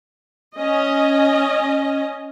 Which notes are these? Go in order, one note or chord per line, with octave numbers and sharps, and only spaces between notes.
C#4 D#5